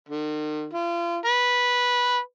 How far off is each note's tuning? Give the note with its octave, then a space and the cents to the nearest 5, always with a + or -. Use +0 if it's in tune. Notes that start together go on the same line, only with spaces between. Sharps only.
D#3 -40
F4 -35
B4 -10